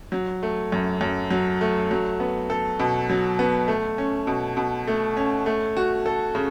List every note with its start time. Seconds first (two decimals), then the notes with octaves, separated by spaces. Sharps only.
0.12 F#3
0.43 A3
0.72 F#2
1.01 F#2
1.31 F#3
1.61 A3
1.91 F#3
2.20 B3
2.50 A4
2.80 B2
3.10 F#3
3.39 B3
3.68 A3
3.98 C#4
4.27 B2
4.57 B2
4.87 A3
5.17 C#4
5.46 A3
5.77 F#4
6.06 A4
6.35 C#3